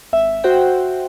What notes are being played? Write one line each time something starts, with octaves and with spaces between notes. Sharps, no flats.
G#1 E5
F#4 C5 F#5 G5